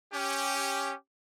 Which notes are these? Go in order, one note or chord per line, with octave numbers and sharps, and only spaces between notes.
C#4 G4